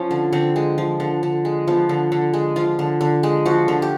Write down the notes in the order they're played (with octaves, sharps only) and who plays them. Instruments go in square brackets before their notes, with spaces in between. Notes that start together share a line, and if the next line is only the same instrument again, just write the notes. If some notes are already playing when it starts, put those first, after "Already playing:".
Already playing: [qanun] F3 C#4
D3
D3 C4
G#3
F3
D3
D3
G#3
F3 B3
D3
D3
G#3
F3 F4
D3
D3
G#3
F3 F#4
D3
G4